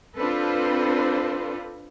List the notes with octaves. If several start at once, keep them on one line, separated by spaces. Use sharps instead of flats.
C4 D4 F4 A4 B4 C5